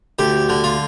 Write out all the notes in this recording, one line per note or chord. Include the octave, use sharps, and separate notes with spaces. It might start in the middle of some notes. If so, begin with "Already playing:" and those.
D2 G4
D3
F4